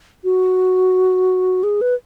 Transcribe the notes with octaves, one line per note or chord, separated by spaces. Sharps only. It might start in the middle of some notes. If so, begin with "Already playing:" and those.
F#4
G#4
B4